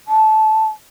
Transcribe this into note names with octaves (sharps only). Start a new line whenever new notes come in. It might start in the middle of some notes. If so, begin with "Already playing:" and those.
A5